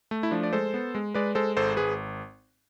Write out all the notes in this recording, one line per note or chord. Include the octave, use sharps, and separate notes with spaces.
A3
E4
F3 D4
D5
G#3 A4 C5
B3
G#3
G#3 B4 D5
G#3 A4 C5
G#1 A4 C5
G#1 G#4 B4